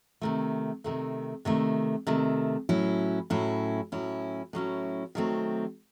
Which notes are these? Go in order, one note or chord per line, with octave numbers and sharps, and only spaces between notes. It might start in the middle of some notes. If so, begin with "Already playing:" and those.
C3 D#3 A3
C3 D#3 A3
C3 D#3 A3
C3 D#3 A3
A2 F#3 C#4 E4
A2 F#3 C#4 E4
A2 F#3 C#4 E4
A2 F#3 C#4 E4
D#3 F#3 A3 C4